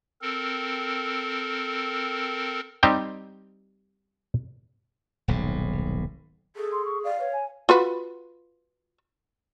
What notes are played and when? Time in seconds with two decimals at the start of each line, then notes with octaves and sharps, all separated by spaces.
0.22 C4 A4 A#4
2.83 G3 C4 D#4 G4 G5
5.28 D#1 B1 G#2
6.55 G#4 A4
6.72 C6
6.85 C#6
7.04 D5 F5
7.19 B4 C#5
7.32 G#5
7.69 F4 F#4 B4